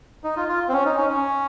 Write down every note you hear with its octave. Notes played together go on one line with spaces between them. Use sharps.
D#4
F4
F4
C4
C#4
D#4
C#4
C#4